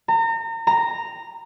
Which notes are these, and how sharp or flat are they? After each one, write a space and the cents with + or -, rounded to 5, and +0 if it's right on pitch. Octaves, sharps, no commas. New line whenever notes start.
A#5 -35
A#5 -10